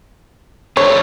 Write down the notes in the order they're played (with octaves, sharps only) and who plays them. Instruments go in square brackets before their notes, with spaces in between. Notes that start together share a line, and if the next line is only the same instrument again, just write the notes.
[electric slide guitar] D4 A4 C5 [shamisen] C#5